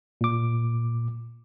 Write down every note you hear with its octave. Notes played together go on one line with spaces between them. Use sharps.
A#2 D6